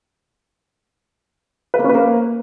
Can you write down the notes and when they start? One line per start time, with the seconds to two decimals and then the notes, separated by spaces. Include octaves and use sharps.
1.74 B4
1.79 A#3
1.84 C#4
1.89 B4
1.95 A#3